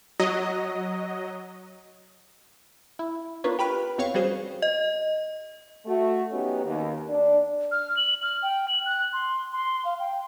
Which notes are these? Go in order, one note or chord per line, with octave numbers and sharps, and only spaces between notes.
F#3 D#5
E4
B3 D4 F4 A#4 B4 C#5
G4 B4 B5 F6 F#6
E2 C4 C#5 F5 C#6
G3 C#4 F#4 G#4 C5
D#5
A3 F#4
F#3 B3 C#4 D#4 F#4 G4
D#2
D4
F6
F#7
F6
G5
F#7
F#6
C6
C6
F5
G5